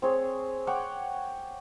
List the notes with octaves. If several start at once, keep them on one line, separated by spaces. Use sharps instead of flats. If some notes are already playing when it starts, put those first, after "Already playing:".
C4 G#4 C#5
C#5 F#5 G5 D6